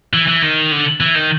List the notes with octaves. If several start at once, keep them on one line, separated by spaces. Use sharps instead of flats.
E3
E3
D#3
D3
E3
D#3